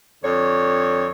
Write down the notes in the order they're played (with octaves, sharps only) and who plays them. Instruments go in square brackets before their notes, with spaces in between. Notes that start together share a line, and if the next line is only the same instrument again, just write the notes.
[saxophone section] F2 D3 C#5